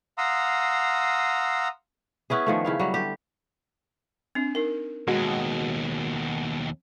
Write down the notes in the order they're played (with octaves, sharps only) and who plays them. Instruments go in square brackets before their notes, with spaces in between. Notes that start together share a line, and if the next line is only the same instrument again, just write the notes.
[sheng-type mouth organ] F5 F#5 A#5 C6 D#6 E6
[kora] B3 C#4 E4 G#4
D#3 F3 A3
C#3 E4 F5
F#3 G3
D3 G4
[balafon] C4 D4
D#4 A#4
[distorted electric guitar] D#2 B2 [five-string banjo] G#3 F#4